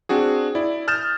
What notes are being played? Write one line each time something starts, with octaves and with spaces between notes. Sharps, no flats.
C4 D4 F#4 G#4
E4 D5
D#6 F6 G6 A6 E7